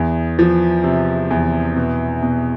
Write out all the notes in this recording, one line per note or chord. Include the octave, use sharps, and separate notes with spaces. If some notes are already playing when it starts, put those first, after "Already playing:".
Already playing: E2
F3
C3
E2
B2
B2